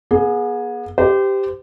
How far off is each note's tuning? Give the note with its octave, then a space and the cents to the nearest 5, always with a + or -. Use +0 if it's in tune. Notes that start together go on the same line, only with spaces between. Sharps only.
B3 -40 G#4 +5
G4 +0 C5 -30